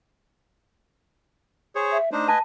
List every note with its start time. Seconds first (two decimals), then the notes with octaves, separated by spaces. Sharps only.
1.75 G#4 C5 C#5
1.91 E5
2.12 A3 D4 D#4 C5
2.28 B4 D#5 G#5 A5